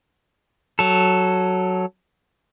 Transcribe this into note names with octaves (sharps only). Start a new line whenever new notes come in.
F#3 A4